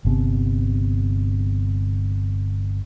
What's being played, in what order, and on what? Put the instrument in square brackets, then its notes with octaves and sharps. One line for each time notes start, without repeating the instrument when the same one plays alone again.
[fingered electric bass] G1 C3 B3